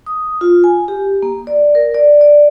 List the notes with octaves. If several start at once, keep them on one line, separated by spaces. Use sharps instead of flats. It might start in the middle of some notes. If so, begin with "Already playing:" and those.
D#6
F4
G#5
G4
A#3
D5
A#4
D5
D5